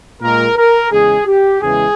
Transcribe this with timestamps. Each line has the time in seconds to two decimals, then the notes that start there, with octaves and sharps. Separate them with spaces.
0.21 A#2 G#3 A#4
0.56 A#4
0.91 E2 C#3 G#3 G#4
1.27 G4
1.62 E2 C#3 E3 G#3 G#4